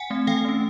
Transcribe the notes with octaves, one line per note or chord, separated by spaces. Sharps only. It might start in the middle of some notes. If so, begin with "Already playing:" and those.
Already playing: F#5 G#5
A3 C4
E3 F5 G5
A3 C#4